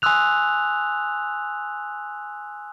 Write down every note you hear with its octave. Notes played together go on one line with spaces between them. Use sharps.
G#5 C6 D#6 E6 F#6 F7